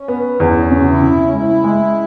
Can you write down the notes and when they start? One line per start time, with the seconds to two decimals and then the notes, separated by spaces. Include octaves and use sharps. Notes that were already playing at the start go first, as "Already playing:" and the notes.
Already playing: C#4
0.08 B3
0.40 E2 C#4
0.71 C#3
0.80 F#4
0.87 E4
1.02 C#3
1.23 C#4
1.33 G#3 E4
1.64 G#3